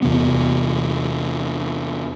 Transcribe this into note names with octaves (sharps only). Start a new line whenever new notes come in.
E2 C3 B3